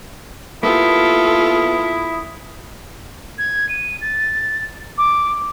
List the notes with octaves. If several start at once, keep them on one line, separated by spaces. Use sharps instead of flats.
A#3 B3 E4 F4 G4 A4 D#6
G#6
D#7
A6
D6